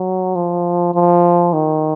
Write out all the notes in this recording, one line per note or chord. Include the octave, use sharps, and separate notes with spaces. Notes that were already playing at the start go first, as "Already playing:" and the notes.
Already playing: F#3
F3
F3
D#3